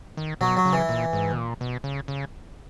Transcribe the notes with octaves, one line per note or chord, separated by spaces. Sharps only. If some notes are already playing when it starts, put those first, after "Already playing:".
D#3
B2 F#3
F#3
C#3
E3
A#2
G#2
B2
A#2
B2
C#3
C#3